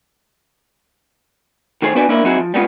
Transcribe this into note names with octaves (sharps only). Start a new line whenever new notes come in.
D#3 A3 G#4 C5 C#5
B3 D4 F#4 B4 D5 G#5
A#3 C#4 D4 E4 A#4
F#3 C4 D#4 E4 F#4 G#4
F3
G3 G#3 B3 C#4 F4